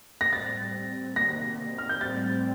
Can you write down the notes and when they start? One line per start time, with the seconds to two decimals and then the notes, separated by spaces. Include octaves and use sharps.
0.21 A#6
0.32 A2 G3 C4 A6
1.16 C3 D#3 A#3 A#6
1.78 F6
1.89 G6
2.01 A2 G3 C4 A6